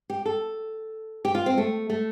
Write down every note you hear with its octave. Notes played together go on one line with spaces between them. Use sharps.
G4
A4
G4
F4
C4
A3
A3